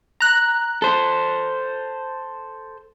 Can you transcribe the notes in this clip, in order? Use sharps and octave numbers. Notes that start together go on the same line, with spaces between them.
A#5 F#6
A4 C5